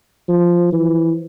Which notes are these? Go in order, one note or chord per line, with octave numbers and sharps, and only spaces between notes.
F3
E3